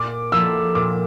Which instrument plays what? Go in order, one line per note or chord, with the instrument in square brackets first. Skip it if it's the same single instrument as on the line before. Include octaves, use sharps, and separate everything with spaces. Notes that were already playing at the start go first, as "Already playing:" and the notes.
Already playing: [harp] A#2 [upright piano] D6
[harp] F3 A#3 E4 A4 [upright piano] E6
[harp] A#2 [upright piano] D6